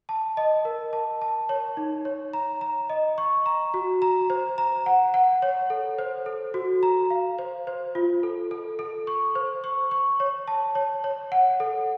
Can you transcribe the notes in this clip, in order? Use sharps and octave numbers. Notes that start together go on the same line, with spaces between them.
A5
D#5
A#4
A5
A5
C#5
D#4
C#5
A#5
A#5
D#5
C#6
A#5
F#4
A#5
C5
A#5
F#5
F#5
C#5
A4
C5
A4
F#4
A#5
F5
C5
C5
F4
A4
A4
A4
C#6
C5
C#6
C#6
C#5
A5
C#5
C#5
F#5
A4